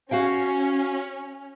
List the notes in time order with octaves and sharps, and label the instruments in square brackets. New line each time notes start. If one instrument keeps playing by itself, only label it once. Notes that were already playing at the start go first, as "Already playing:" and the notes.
[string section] C#4 [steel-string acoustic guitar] F#4 F5 G5